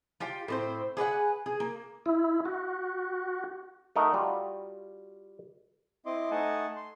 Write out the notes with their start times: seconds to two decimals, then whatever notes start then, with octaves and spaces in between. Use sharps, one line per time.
0.20 F4 G4 G5
0.48 A2 C4 C5
0.97 G#4 B4 D5 F#5
1.46 G#4
1.60 A#3
2.06 E4
2.45 F#4
3.96 A3 D#4 A#4 D#5 E5 F#5
4.13 G3 F4 F#4
6.06 C4 E4 D#5 C6 D6
6.31 A3 D#4 D#5 F#5 G#5 A5
6.76 C6